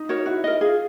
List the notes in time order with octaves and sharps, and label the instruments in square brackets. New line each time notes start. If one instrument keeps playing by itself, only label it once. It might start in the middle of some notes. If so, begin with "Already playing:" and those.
Already playing: [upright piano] D#4
[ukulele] F#4 A#4 C#5
[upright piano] E4 [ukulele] F#4
[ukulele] A#4 D#5
[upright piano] F4 [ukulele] G#4